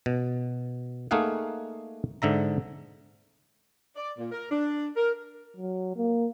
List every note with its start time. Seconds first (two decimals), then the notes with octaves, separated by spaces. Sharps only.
0.06 B2
1.11 A3 A#3 D#4 G#4 F5 F#5
2.22 G#2 D3 E5 A#5
3.96 D5
4.18 A#2
4.32 A#4
4.51 D4
4.97 A#4
5.57 F#3
5.96 A#3